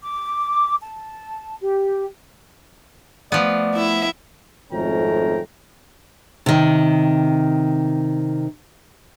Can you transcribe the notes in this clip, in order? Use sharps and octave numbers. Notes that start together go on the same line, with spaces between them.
D6
A5
G4
F3 A3 B3 D5
E4 E5
G#1 F2 A3 C#4 G5 A#5
C3 D#3